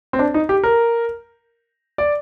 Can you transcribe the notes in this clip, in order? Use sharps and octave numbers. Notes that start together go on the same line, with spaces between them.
C4
D4
D#4
G4
A#4
D5